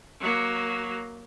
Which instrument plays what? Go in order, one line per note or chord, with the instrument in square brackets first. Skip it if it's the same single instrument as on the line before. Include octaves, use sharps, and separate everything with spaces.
[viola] F#3 A#3